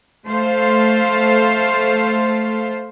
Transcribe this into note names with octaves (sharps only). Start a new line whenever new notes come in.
A3 A4 C5 F5